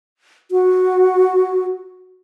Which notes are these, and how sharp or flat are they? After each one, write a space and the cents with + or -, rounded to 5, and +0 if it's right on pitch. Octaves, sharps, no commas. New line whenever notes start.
F#4 -5